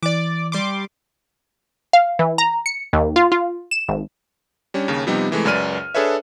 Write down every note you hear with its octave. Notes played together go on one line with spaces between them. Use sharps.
E3 D5 D6
G3 C6 D6
F5
E3
A#5
C#7
D#2
F4
F4
E7
G#1
G3 C#4 D4
D#2 C#3
C3 F3 G3 B3 D#4 G4
C3 E3 G#3 A3
C#2 F#2 B4 D5 F6 D#7
D4 G#4 A4 B4 C#5 E5